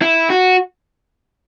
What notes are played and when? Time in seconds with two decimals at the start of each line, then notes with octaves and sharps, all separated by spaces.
0.02 E4
0.30 F#4